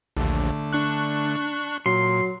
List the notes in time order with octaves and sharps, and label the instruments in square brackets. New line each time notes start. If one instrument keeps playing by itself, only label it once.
[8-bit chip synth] A#1 D#2 [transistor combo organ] D3 A3
[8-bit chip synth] D4 C#6 F#6
[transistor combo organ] A#2 [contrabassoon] F#3 [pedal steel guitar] C6